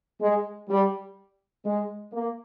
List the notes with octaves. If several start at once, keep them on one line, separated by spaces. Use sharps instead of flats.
G#3
G3
G#3
A#3